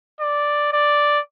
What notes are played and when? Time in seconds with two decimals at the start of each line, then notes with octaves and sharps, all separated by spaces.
0.21 D5
0.73 D5